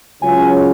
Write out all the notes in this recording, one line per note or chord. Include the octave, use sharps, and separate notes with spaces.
C#2 C#3 F#3 C#4 F4 G#5